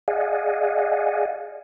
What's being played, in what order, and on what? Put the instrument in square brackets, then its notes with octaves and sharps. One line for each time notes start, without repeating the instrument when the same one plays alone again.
[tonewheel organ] G#4 D5 D#5 F5 F#5 G#5